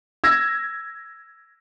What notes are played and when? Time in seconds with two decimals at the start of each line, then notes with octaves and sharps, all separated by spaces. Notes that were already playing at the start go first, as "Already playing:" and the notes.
0.24 E6 G#6 A#6